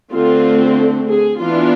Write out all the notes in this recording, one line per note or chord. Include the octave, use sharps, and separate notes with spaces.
D3 A3 C4 F4
G#4
E3 B3 D4 F4